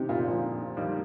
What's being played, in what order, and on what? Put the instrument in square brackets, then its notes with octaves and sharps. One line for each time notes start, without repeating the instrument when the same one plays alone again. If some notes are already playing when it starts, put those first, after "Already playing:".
Already playing: [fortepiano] C3 D#3 [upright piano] C4 D#4 G4
[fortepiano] A#2
[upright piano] F2 D3 F3
F2 D3 G3 A#3 D#4